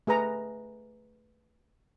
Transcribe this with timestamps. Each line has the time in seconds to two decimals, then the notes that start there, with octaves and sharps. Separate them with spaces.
0.07 A3 G#4 B4 A#5